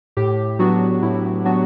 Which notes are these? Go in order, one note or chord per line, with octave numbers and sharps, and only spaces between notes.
A2 G4
F#3 B3 D4 F#4
A2 E4
F#3 B3 D4 F#4